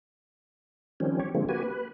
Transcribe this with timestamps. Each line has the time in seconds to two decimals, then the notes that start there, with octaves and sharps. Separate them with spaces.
1.00 D#3 F3 G3 C4 C#4
1.19 G4 C#5
1.35 D3 F3 G#3 A#3 C4
1.49 A#3 F#4 G4 B4 G#5
1.63 B4